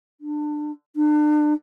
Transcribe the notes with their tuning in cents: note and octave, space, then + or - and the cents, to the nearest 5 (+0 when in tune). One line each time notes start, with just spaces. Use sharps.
D4 +25
D4 +35